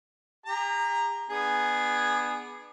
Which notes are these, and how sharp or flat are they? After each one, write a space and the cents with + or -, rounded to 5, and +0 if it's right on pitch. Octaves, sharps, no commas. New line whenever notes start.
G4 +45 A#5 +0
B3 +0 D4 +30 G#4 +0